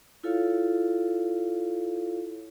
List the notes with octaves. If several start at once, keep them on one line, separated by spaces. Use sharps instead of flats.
E4 F4 A4 C#5 F5